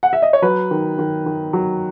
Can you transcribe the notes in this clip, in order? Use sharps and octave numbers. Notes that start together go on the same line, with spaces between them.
F#5
E5
D#5
C#5
F#3 B4
D#3
D#3
D#3
F#3